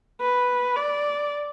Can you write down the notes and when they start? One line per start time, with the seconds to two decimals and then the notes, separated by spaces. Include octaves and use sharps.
0.21 B4
0.77 D5